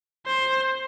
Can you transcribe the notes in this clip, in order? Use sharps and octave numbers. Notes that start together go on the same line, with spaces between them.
C5